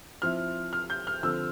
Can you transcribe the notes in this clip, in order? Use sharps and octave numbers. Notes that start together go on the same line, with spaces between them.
F3 C4 E4 F6
F6
G6
F6
D3 F3 C4 E6